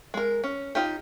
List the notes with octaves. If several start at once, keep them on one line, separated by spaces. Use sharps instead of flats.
G#3 A#4
C#4
D#4 F4 G4